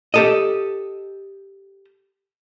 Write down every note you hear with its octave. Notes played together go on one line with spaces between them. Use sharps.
G4 A4 D#5